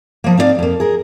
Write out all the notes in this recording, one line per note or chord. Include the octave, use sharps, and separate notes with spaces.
F3 A#3
C4 D#4 E4 D5 F5
F2 A#3
G#4 A#4